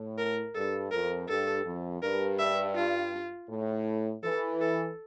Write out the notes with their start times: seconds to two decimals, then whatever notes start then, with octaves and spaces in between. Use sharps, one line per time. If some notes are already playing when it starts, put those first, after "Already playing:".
Already playing: A2
0.18 A#4
0.54 G2 A4
0.91 F2 A#4
1.29 G2 A4
1.65 F2
2.02 G2 A#4
2.39 E5
2.75 F4
3.49 A2
4.23 E3 A4
4.61 A4